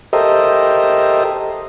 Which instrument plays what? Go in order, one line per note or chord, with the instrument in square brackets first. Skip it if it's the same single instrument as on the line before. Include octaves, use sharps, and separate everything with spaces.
[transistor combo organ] G4 A4 A#4 C5 D#5 E5